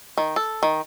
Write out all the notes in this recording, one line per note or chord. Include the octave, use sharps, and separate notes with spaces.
D#3
A4
D#3